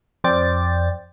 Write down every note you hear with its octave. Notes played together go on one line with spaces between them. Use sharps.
F2 C5 D5 G5 A6